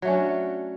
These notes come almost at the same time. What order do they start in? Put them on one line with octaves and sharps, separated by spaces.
F#3 A3 C#4 D4